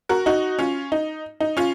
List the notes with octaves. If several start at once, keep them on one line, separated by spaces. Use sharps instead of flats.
F#4 A#4
D#4 F#4
C#4 F4
D#4
D#4
C#4 F4